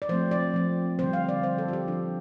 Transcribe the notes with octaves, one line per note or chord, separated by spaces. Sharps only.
D5
F3 A3 C4 C5
D5
F3 C4
D3 G3 C4 C5
F5
D5
F3 C4 C5
A4
F4
G4
F3 C4 D4